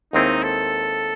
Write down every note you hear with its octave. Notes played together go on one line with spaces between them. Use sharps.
D#2 D#3 G#3 C4 D#4 E4
A4